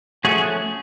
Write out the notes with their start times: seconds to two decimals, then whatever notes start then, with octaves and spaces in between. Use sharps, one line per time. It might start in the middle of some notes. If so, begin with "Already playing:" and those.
0.24 F3 A3 C#4 F#4 G#4